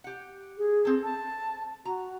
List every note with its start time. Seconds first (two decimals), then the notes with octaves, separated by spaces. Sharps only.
0.04 G4 F#5
0.58 G#4
0.85 C4 A4
1.04 A5
1.85 F#4 A#5